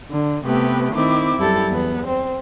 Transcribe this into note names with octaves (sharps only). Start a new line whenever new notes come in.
D3
C3 A3 B3 G4 B4
D#3 C4 E4 D6
F#2 G3 E4 G4 A4 A6
E2 B3
C4